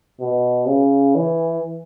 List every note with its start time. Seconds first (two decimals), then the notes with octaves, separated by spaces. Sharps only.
0.21 B2
0.67 C#3
1.15 E3